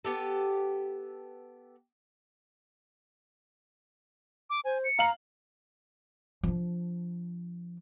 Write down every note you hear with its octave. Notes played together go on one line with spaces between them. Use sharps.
B3 G4 A4
D6
C5 G#5
C#7
F5 A#5 F#7
F3 D4